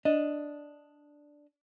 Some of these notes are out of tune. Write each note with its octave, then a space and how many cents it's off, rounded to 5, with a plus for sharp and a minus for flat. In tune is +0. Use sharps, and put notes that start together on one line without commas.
D4 +0 D#5 +0